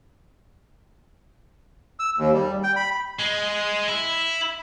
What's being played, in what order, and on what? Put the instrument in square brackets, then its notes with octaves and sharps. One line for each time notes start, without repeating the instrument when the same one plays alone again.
[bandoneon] E6
D#2
G3
G5
B5
[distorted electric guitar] G#3
E4